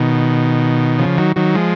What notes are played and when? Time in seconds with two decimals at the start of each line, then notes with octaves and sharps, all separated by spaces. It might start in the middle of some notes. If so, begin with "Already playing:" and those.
Already playing: B2 D#3
0.99 C#3 F3
1.18 D#3 F#3
1.36 D#3 F#3
1.55 F3 G#3